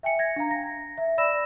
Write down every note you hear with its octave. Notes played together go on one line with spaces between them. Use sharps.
E5 G5 G#5 C#7
G#6 A#6
D4 F5 A#5
A#6
E5
D5 B5 E6 A#6 E7